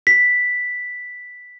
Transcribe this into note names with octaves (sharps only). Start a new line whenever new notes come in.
B6